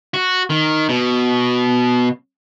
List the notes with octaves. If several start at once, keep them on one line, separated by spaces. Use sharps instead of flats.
F#4
D#3
B2